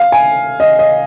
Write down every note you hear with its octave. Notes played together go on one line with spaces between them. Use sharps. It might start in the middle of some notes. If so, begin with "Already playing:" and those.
Already playing: F5
G#5
D#5
D#5